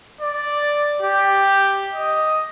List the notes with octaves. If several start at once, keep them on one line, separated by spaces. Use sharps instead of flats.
D5
G4
D#5